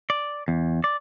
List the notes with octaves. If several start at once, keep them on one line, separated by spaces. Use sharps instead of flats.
D5
E2
D5